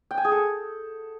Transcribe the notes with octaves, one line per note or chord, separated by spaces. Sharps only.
G5
G#5
G#4
A4